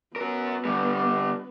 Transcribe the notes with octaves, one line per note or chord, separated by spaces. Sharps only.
B3 F#4 A#4
D3 G3